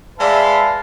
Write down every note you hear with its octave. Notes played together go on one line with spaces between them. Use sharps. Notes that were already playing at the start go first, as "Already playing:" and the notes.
G#3 B4 D5 E5 F5 A5